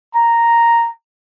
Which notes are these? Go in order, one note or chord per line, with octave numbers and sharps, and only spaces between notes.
A#5